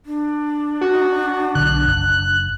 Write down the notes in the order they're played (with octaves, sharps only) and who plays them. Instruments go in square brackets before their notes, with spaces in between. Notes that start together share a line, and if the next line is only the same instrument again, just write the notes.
[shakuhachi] D4
[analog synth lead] F#4
[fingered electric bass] B1 D3 [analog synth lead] F#6
[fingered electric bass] F#1